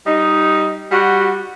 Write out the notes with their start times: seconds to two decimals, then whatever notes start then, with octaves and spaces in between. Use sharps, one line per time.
0.05 G3 D#4
0.90 G3 F#4